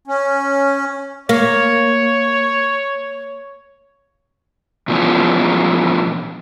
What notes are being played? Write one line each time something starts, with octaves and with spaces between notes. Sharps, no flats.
C#4
A#3 C#5
A#2 E3 F3 B3 C#4